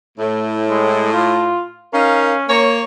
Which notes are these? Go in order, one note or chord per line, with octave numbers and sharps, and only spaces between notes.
A2
G#3
F4
C#4 D#4 A#4 F5
A#3 C#5